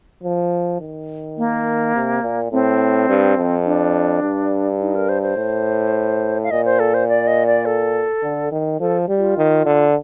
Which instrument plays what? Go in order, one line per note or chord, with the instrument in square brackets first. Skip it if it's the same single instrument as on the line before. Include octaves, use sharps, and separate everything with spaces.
[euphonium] F3
D#3
[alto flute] A#3
[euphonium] C3
A#2
[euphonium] A2 [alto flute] C4
[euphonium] G2
F2
[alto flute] D4
[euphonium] G2
[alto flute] D#4
A#4
C5
C5
[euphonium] A2
[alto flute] F5
[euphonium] A#2 [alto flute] D#5
[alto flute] C5
A4
C5
D5
D#5
D5
A4
[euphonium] D3
D#3
[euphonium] F3 [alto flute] A4
[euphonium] G3
[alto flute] F4
[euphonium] D#3
D3